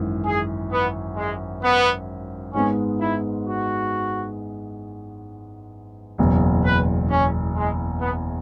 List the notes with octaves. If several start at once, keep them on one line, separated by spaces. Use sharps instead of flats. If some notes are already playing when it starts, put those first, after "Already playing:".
Already playing: G#1 F#2 E3
G#4
B3
G#3
B3
G#2 G#3 B3 C#4
E4
F#4
F#1 E2 B2
B4
C#4
G#3
B3